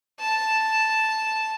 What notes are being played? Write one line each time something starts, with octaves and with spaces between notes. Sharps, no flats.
A5